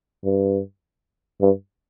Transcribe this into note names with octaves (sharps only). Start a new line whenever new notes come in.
G2
G2